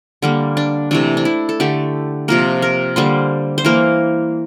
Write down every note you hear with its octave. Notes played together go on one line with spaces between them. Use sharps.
D3 G3 A#3
D4
C3 E3 A3 D4
D4
E4
A4
D3 A3 G4
C3 F3 A#3 A#4
A#4
D3 G3 A#3 C5
C5
E3 A#3 A#4